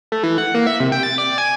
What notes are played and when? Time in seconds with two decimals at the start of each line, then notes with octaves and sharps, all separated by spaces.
0.12 A3
0.23 E3
0.38 F#5
0.55 A#3
0.67 E5
0.80 C3
0.92 G5
1.03 A6
1.18 D5
1.38 G#5